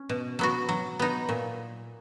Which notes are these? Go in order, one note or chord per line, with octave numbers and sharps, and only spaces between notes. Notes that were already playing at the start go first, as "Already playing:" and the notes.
Already playing: C#4
B2
F#3 B3 F#4
F#3
B3 D#4
A#2